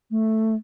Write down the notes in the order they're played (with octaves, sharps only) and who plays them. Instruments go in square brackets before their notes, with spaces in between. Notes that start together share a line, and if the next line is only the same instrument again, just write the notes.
[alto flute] A3